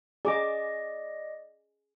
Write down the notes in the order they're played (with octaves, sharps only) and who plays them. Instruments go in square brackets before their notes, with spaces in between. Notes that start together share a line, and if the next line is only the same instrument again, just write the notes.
[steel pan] G#4 D6 [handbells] D5 D#5